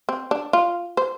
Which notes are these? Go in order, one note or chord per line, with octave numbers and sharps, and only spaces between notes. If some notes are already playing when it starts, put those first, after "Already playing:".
C4
D4
F4
C5